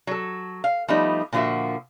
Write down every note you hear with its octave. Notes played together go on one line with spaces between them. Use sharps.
F#3 A4
F5
F3 G3 A3 B3 D#4
A#2 D3 F3 F#4 A#4 E5